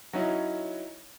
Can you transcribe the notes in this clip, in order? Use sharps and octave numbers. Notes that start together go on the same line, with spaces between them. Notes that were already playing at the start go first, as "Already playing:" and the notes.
F#3 C#4 D#4 E4